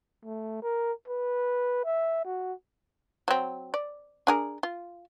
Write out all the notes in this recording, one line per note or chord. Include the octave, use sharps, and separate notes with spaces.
A3
A#4
B4
E5
F#4
F#3 C4
D5
D4 G#4 A#4
F4